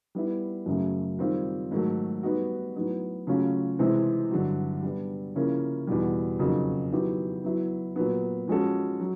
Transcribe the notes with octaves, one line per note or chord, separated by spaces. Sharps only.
G3 B3 E4
F#2 C#3 F#3 A3
D#3 G3 C4 F4
G#2 D#3 F#3 A3
G3 B3 D#4 F#4
A2 F#3 B3 D#4
C#3 F#3 A3 C#4 F4
C3 E3 G#3 C4
G2 D3 F#3
G3 B3 D4
C#3 F3 A#3 C#4 E4
E2 B2 G3
F2 C#3 F#3 A#3 D#4
D#3 F#3 B3 E4 G4
F#3 B3 E4
A#2 F#3 B3
F3 G#3 C#4 F#4 A4
F#3